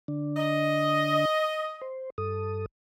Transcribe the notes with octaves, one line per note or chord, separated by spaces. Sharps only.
D3 D4
D#5
C5
G2 A4 D#6